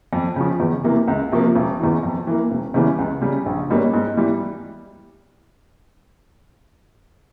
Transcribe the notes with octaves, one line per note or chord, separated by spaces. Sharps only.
F2
C#3 F3
E2
C3 E3 A#3
C#2
C3 F3 A#3
E1
E2 E3
F2
E3 A#3
E1
E2 C#3 E3 G3
C#2
C#3 G3
A#1
G#2 G3 A#3 C#4
G#2
E3 G3